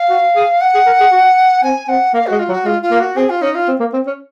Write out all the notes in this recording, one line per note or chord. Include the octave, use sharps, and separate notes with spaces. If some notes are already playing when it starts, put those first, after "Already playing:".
Already playing: F5
F#4
G#4
F#5
G#4
A#4
G#4
F#4
C4 G#5
C4 F#5
A#3 F5
G#3 F#4
F4
F#3
F#4
G#3 F4
F4
A#3
F#4
C4 G#4
F4
C#4 D#4
F4
C4
A#3
C4
C#4